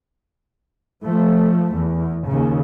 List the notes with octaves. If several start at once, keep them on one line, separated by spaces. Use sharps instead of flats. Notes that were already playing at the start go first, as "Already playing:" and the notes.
F3 A3
E2
D#2 C#3